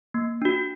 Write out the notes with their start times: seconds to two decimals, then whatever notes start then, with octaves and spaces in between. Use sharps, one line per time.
0.14 A#3
0.42 D4 F#4